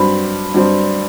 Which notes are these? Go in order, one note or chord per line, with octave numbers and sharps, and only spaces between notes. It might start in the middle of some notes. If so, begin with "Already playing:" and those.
Already playing: G2 F#3 C4 B5
G2 F#3 C4